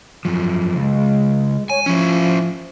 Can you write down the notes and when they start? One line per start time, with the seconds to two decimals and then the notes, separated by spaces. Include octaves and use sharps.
0.25 F#2 F3
0.76 C#2 G#3
1.70 C#5 G#5
1.86 F3 C#4 E4